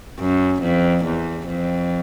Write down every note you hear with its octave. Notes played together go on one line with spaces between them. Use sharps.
F#2
F2
E2
F2